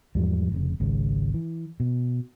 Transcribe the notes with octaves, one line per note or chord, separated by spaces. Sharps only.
E2 G#2 F3 G3
F1 G#2 C#3
G#1 C#2 C#3
E3
B2